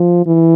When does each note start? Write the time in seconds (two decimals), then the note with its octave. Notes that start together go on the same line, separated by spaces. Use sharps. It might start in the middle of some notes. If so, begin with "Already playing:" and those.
Already playing: F3
0.26 E3